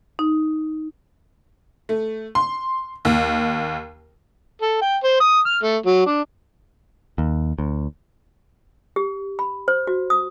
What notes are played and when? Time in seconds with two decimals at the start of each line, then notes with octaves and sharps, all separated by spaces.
0.19 D#4
1.89 A3
2.35 C6
3.05 D#2
4.62 A4
4.82 G5
5.04 C5
5.20 D#6
5.46 F6
5.63 A3
5.86 F#3
6.06 D4
7.18 D#2
7.58 D2
8.96 G4
9.39 B5
9.68 C5
9.87 F#4
10.10 D#6